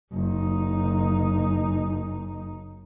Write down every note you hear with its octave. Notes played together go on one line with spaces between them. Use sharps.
F#1 D#4